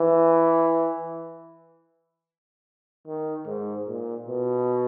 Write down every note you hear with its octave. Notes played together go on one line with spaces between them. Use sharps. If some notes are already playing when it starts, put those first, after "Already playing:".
Already playing: E3
D#3
G#2
A#2
B2